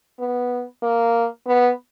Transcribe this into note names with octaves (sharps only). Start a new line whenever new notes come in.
B3
A#3
B3